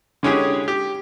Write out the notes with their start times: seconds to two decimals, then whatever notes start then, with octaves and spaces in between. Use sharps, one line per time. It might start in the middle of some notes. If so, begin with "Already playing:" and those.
0.23 D3 G#3 C#4 E4 G4 G#4
0.68 G4